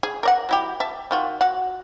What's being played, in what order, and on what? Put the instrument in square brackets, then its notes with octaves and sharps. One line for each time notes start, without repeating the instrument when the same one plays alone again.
[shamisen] G#4
A#4 D5 F#5
F#3 E4 G4
E5 A5
D#3 F4 F#4
F#4 F#5